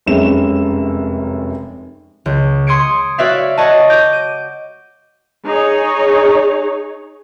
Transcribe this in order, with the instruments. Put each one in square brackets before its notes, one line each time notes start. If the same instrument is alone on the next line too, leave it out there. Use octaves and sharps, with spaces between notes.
[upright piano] F1 F#2 C3 G#3 C#4 E7
[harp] C#2
C6 D#6 G#6 C#7 D7
F#4 C#5 D5 E5 F5
C#5 D#5 F#5 A5
D6 G6 A#6
D#7
[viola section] D#4 G#4 C#5